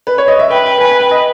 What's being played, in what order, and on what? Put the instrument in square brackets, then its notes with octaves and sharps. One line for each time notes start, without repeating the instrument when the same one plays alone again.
[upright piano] B4
C#5
D#5
E5
[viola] B4 [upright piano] G5
[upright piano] G5
[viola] B4 [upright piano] G#5
[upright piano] G#5
G5
D#5